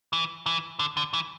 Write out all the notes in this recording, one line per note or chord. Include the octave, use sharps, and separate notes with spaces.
E3
E3
D3
D3
E3